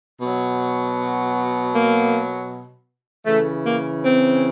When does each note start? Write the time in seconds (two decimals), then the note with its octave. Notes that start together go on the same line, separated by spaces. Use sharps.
0.20 B2 F#3
1.73 A#3
3.26 C#3 E3 A3
3.64 A#3
4.02 C4